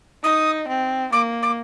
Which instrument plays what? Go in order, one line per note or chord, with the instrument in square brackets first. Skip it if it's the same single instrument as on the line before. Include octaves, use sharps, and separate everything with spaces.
[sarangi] D#4 [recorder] D#6
[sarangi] C4
[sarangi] A#3 [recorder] D6
[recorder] D6